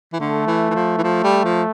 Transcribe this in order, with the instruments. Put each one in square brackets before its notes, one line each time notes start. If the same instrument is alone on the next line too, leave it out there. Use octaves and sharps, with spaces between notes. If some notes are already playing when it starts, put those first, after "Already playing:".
[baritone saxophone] E3
[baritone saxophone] D3 [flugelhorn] A3
[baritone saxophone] E3
E3
F3
E3
[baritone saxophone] F3 [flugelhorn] A3
[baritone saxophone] G3
F3